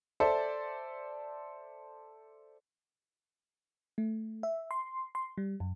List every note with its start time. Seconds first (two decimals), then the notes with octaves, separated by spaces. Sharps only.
0.20 A4 C5 D5 E5
3.98 A3
4.43 E5
4.71 C6
5.15 C6
5.38 G3
5.60 F#2